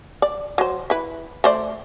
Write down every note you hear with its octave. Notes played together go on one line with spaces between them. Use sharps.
D5
F#3 C5
E4 B4
A3 C5 D5